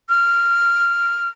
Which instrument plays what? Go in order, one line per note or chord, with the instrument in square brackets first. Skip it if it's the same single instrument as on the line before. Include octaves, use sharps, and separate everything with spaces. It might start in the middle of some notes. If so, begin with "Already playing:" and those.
[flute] F6